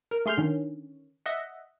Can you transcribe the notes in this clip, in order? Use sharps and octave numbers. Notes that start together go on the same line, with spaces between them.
A#4
A3 G#4 C6 F6 G6 C7
D3 D#3 C#4
D#5 E5 F#5